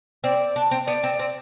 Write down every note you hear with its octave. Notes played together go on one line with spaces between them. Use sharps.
C4 D5
D4
C4
B3 D5
C4
C4